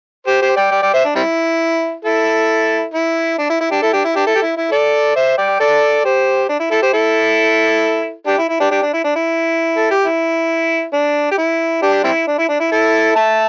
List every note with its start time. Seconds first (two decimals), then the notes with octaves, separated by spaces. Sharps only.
0.27 G4 C5
0.42 G4 C5
0.57 D5 G5
0.71 D5 G5
0.83 D5 G5
0.94 C5 E5
1.05 D4
1.16 G3 C4 E4
2.05 E4 A4
2.94 E4
3.38 D4
3.50 E4
3.60 E4
3.71 D4 G4
3.82 E4 A4
3.93 D4 G4
4.04 E4
4.16 D4 G4
4.27 E4 A4
4.35 G4
4.42 E4
4.57 E4
4.71 A4 D5
5.16 C5 E5
5.38 D5 G5
5.60 A4 D5
6.05 G4 C5
6.49 D4
6.60 E4
6.71 E4 A4
6.82 G4 C5
6.93 E4 A4
8.27 D4 G4
8.38 E4
8.49 E4
8.60 D4 G4
8.71 D4 G4
8.82 D4
8.94 E4
9.05 D4
9.16 E4
9.77 A4
9.91 G4
10.05 E4
10.93 D4
11.31 G4
11.38 E4
11.82 D4 G4
12.04 G3 C4 E4
12.27 D4
12.38 E4
12.49 D4
12.60 E4
12.71 E4 A4
13.16 E5 A5